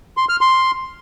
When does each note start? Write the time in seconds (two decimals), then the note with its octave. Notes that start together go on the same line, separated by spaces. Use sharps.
0.17 C6
0.29 F6
0.41 C6